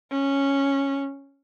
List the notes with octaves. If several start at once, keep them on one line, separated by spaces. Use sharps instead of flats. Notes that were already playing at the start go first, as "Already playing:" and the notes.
C#4